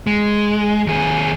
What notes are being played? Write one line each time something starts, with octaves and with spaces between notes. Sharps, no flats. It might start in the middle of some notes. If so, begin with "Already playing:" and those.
G#3
D#2 G#4